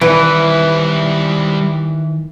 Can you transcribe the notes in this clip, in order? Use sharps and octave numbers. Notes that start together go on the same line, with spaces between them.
D#3 E3 G3 E4 B4